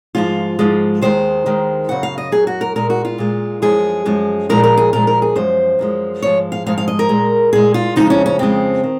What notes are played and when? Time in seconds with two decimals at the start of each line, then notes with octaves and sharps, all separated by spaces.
0.15 G#2 F3 G#3 F4
0.59 G#2 F3 G#3
1.01 D#2 D#3 G#3 C5
1.46 D#2 D#3 G#3
1.89 F#2 C#3 F#3 F#5
2.03 F5
2.18 D#5
2.32 F#2 C#3 F#3 G#4
2.47 F#4
2.61 A#4
2.75 A#2 G#3 A#4
2.90 F#4
3.05 F4
3.18 A#2 G#3
3.62 F#2 F3 G#3 G#4
4.05 F#2 F3 G#3
4.49 A#2 F3 G#3 A#4
4.64 A#4
4.77 G#4
4.93 A#2 F3 G#3 A#4
5.07 A#4
5.22 G#4
5.36 F#2 F3 G#3 C5
5.79 F#2 F3 G#3
6.23 G#2 F3 G#3 C#5
6.52 F5
6.66 G#2 F3 G#3 F5
6.78 F5
6.88 D#5
6.99 A#4
7.09 A#2 G#3
7.53 A#2 G#3 G#4
7.74 F4
7.96 F2 C#3 F3 G#3 D#4
8.10 C#4
8.26 C#4
8.39 F2 C#3 F3 G#3 C4
8.84 D#3